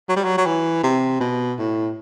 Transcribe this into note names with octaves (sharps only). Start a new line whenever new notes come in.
F#3
G3
F#3
F#3
E3
C3
B2
A2